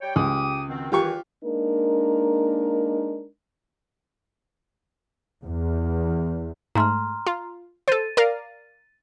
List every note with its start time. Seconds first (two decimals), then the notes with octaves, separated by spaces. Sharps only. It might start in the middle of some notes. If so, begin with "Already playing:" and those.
0.01 G3 C#5 G5
0.16 C#2 G4 D6 D#6
0.68 B2 D#3 C4
0.92 E2 D#3 E3 F4 G4 C#6
1.44 G#3 A#3 D4 D#4 A#4
5.43 E2
6.75 G#2 A3 A#5 C6 F6
7.27 F4
7.88 A4 C5 A6 D#7
8.17 A#4 D5 F5